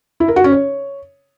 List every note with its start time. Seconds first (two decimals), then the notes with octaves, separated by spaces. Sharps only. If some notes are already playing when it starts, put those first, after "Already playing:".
0.20 E4
0.28 A#4
0.36 F#4
0.44 C#4
0.52 C#5